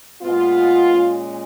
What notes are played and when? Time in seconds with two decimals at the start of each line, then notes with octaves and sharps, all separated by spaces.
0.21 A#2 G#3 B3 F4
0.91 A#2 G#3 C#4